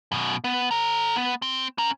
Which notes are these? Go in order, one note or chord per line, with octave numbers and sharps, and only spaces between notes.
F#2 B2
B3
A4 A#5
B3
C4
C#4 A#5